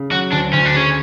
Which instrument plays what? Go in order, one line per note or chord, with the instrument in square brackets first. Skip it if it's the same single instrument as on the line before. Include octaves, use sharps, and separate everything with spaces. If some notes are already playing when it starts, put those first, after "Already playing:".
Already playing: [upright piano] C#3
[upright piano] F#3 [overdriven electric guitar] F#4
[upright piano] D2 [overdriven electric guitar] D4
[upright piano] D2 [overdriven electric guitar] C#4
[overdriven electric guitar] D4
[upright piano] C#3 [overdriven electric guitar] C#4